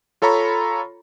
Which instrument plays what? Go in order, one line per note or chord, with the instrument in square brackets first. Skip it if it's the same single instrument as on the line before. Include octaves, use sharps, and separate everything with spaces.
[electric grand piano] F4 A4 C#5 A#5 B5 C#6